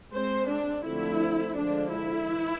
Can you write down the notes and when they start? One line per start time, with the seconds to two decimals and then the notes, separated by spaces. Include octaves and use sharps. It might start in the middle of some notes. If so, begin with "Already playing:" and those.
0.11 G#3 C4 C5
0.47 D4
0.84 D3 F3 A3 C4 E4
1.55 D3 F3 G#3 D4
1.92 E4
2.28 E3